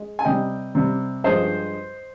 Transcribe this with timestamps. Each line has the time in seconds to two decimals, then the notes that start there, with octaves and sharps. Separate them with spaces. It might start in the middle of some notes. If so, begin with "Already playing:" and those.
Already playing: G#3
0.19 G#5
0.25 C3 G3 D#5 G5
0.75 C3 G3
1.24 G2 F3 G#3 C5 D#5